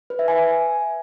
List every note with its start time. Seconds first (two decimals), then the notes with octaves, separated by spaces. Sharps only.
0.10 B4
0.19 E5
0.28 G#5